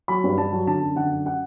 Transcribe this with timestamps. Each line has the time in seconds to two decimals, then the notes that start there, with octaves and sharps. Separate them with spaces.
0.08 F#3 B5
0.24 G2
0.38 G2 A5
0.52 F#3
0.67 D3 A5
0.82 F#2
0.96 D3 F#5
1.11 F#2
1.26 F#5